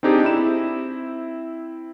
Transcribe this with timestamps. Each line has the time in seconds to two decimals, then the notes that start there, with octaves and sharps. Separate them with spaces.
0.03 C4 D4 D#4 G4 G#4
0.23 C4 E4 E7